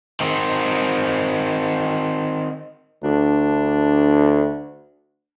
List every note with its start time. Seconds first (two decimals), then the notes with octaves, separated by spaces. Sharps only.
0.20 D#3 C4
3.04 D2 D4